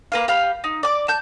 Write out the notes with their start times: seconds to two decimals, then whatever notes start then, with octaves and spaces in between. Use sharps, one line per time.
0.12 A#3 B4 F5
0.28 G4 F5 B5
0.64 D#4
0.83 D5 D6
1.08 A5 G6